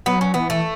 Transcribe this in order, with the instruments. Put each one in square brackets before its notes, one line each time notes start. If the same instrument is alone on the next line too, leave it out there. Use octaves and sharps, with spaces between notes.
[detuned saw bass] F#3 [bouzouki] B3
[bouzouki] C#4
[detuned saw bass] E3 [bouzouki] B3
[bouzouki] A3